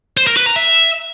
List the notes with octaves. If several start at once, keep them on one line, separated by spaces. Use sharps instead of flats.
C5
A#4
B4
A#5
E5